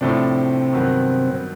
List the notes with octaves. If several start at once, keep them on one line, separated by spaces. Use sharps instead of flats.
A2 C3 F3 A3 C4 D4
G2 D#3 F#3 B3